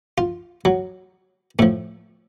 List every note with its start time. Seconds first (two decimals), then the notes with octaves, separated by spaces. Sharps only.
0.18 F4
0.65 F#3
1.59 A2 F3 A3